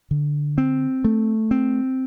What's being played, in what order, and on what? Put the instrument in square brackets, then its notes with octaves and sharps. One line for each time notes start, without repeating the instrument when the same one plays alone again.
[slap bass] D3
C4
A3
C4